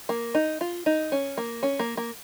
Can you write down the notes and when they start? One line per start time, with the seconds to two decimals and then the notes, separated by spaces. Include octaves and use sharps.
0.09 A#3
0.35 D#4
0.61 F4
0.86 D#4
1.12 C#4
1.37 A#3
1.63 C#4
1.79 A#3
1.97 A#3